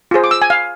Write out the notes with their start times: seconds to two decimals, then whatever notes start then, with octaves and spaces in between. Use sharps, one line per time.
0.11 F4 G#4 C5
0.24 D6
0.31 E6
0.42 G#5
0.50 F5